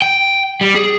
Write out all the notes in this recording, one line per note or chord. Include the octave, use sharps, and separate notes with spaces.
G5
G3
G#4